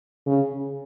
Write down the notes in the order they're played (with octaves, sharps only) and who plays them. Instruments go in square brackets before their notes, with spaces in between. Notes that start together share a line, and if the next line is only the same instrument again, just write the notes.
[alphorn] C#3